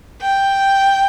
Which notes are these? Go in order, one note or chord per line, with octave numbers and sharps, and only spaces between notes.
G5